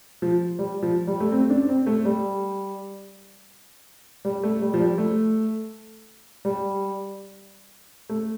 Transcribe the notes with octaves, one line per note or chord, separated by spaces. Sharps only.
F3
G3
F3
G3
A3
C4
D4
C4
A3
G3
G3
A3
G3
F3
G3
A3
G3
A3